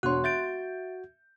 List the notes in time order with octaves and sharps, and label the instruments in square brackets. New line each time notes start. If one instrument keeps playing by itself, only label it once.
[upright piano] E1 D4 C#5 [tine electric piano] F#4 [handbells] C6 F#6
[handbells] E5 A6 D7 [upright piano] G6